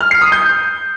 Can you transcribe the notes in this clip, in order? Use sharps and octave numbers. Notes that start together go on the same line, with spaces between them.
F6
C7
D#6
G6